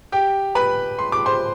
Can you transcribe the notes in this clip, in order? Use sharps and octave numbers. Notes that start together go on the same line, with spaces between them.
G4 G5
B4 B5
C6
D6
C5 C6